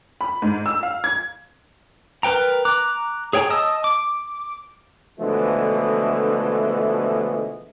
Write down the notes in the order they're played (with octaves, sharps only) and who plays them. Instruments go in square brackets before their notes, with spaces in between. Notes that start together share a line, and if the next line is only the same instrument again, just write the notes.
[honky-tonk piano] B5
G#2
E6
F5
G#6
[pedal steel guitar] A#4 B4 G5 A#5
A#5 D6 F#6
G#4 C#5 G5 G#5 A#5
D#5 A5 D#6 E6
D6
[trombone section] B2 D3 E3 F3 G#3 A3